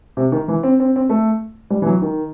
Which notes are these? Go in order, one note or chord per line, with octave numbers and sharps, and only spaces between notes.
C3
D#3
E3
C4
C4
C4
A3
G3
E3
F#3
D#3